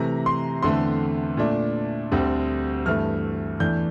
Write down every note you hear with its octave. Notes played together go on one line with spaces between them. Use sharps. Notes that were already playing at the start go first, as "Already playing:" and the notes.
Already playing: C3 E3 A3 A#5
C6
E2 D3 A3 C4 C6
A#2 A3 D4
D2 D3 G3 C4
G2 E3 A3 F6
E2 E3 A3 D4 G6